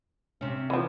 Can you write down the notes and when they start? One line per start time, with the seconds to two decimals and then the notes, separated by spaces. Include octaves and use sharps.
0.41 C3 C#4
0.70 E3 F3